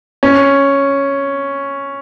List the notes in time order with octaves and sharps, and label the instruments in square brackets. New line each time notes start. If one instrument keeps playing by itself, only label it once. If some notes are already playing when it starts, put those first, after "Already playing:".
[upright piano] C#4